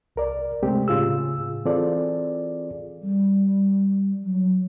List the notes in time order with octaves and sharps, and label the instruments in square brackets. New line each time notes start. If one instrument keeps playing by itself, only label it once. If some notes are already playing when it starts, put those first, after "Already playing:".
[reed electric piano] C2 A#4 D5
C3 G#3 A3 C4 G4
A2 C#3 F4 G#4 E6
E3 C4 F4 G#4 A4 D5
[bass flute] G3
F#3